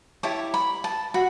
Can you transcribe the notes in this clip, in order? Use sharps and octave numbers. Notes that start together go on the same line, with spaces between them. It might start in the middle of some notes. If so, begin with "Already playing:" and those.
E4 G4 C#5 A5
B5
A5
F#4 B5